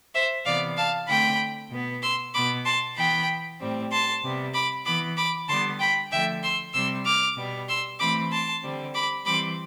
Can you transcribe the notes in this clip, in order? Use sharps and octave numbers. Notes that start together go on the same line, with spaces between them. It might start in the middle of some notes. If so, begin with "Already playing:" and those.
C5 E5
C3 E3 B3 D5 F5
F5 A5
D3 A3 C4 G5 B5
B2 B3
C6 E6
B2 B3 B5 D6
A5 C6
E3 B3 G5 B5
A2 G3 C4
A5 C6
C3 G3 B3
B5 D6
E3 B3 B5 D6
B5 D6
D3 G3 B3 A5 C6
G5 B5
D3 F3 A3 E5 G5
C6 E6
C3 G3 C4 C6 E6
D6 F6
B2 G3 B3
C6 E6
E3 A3 C4 B5 D6
A5 C6
D3 G3 C4
B5 D6
E3 G3 C4 B5 D6